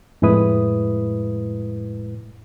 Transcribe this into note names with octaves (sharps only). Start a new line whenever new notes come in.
F2 A2 G#3 E4 B4 D#6